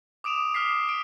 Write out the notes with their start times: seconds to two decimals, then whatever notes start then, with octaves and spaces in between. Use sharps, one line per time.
0.24 D6 D#6 D7 E7 F7
0.55 D6 D#6 F6 B6 C7
0.89 D7